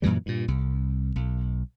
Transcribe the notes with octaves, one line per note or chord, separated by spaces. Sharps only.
F#2 A#2 E3 G3
G2 A#2
C2
B1